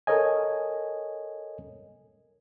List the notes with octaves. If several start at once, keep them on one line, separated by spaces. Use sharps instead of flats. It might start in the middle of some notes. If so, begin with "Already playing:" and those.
A4 A#4 C#5 D#5 G#5